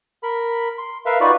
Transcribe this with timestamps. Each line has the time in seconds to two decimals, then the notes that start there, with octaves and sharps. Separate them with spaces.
0.23 A#4 B5
0.78 C6
1.06 A#4 B4 E5 F5
1.21 D#4 F4 F#4 B4 D5